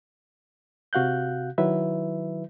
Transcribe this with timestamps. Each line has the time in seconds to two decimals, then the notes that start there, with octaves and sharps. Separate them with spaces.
0.93 C3 F#4 F5 F#6 G6
1.58 D#3 F#3 E4 B4 E5